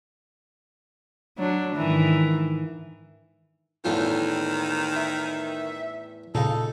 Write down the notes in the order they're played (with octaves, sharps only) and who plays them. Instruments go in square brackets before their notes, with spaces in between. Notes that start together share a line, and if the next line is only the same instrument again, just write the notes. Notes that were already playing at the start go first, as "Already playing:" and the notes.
[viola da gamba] F#3 D4
G#2 D#3 E3
[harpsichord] E2 A2 F4 [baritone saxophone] D#3
[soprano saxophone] E5
[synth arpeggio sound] A#2 C#3 [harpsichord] D#4 [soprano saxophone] A4